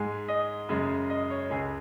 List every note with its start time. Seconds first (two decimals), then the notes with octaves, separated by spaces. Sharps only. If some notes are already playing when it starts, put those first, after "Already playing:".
Already playing: G#2 G#3 G#5
0.28 D#5
0.69 F#2 C#3 G#3
1.10 D#5
1.30 C#5
1.50 C#2 C#3 G#3 G#4